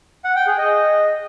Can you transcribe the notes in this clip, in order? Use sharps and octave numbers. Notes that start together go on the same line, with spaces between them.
F#5
G5
G#4
D#5